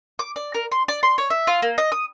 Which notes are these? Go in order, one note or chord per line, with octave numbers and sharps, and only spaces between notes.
D6
D5
A#4
C6
D5
C6
C#5
E5
F4
A#3
D#5
D#6